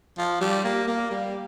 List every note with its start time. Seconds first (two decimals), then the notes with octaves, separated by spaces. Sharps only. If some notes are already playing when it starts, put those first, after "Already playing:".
0.18 F3
0.41 G3
0.64 A#3
0.87 A#3
1.10 G3